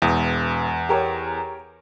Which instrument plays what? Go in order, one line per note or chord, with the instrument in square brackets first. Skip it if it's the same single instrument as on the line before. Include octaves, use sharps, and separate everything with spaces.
[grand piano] E1 D#6 [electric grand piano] E2
[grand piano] G4 A#4 C#5